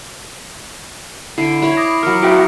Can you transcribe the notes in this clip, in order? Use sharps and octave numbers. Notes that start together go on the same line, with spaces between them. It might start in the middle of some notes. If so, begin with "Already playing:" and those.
D3 E4 C7 D7
E4 C#5 B5
D6 D#6 A#6
F#3 A#4 F6 C#7
E4 F#4 G4